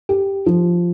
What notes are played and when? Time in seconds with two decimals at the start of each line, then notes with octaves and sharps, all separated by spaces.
0.09 G4
0.46 F3